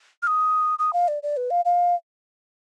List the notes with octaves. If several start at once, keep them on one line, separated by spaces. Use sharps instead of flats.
F6
D#6
D#6
F5
D5
D5
B4
F5
F5